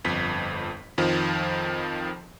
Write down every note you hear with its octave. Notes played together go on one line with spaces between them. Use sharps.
G1 F2 B6
F2 D#3 F3